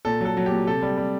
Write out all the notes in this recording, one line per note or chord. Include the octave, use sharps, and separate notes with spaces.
A#2 A4
F#3 A4
F#3
G4
A#2
C3 A4
G3
G3